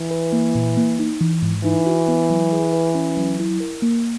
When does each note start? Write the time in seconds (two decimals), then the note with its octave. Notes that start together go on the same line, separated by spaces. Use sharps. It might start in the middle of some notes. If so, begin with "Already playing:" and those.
Already playing: E3
0.11 B4
0.33 A#3
0.55 A#2
0.77 A#3
0.99 D#4
1.21 E3
1.42 G#2
1.64 E3 D#4
1.86 F#4
2.08 B3
2.30 F#3
2.52 G#4
2.73 B4
2.95 C#4
3.17 F#3
3.40 E4
3.60 A#4
3.82 A#3